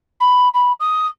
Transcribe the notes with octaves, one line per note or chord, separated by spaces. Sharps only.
B5
B5
D#6